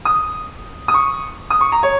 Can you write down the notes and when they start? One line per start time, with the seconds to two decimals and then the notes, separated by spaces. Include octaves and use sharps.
0.05 D#6
0.88 D#6
0.94 C#6
1.50 D#6
1.61 C#6
1.72 A#5
1.83 C#5